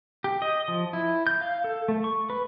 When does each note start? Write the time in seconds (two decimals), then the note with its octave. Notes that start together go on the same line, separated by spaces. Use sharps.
0.24 G4
0.42 D#5
0.68 F3
0.93 E4
1.27 G6
1.41 F5
1.64 A4
1.88 A3
2.04 C#6
2.30 B4